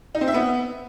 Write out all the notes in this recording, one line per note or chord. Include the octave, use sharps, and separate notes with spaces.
D#4
C4
E5
B3